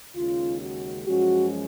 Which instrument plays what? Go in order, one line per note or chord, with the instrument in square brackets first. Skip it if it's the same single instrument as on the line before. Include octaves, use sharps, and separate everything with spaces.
[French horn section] D#2 C#3 G#3 C#4 F4
F#4
F#2 F3 G#3 C#4 F#4